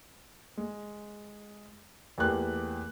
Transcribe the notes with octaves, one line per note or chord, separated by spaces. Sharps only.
G#3
E2 A3 A#3 G4 F#6